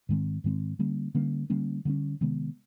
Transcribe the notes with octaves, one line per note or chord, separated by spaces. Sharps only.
G#2 D#3 G#3 C4
G#2 D#3 G#3 C4
D3 G3 A#3 C#4
D3 G3 A#3 C#4
D3 G3 A#3 C#4
D3 G3 A#3 C#4
C3 D#3 G#3 B3